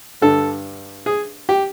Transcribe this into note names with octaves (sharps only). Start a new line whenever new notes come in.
G2 D3 A4
G#4
G4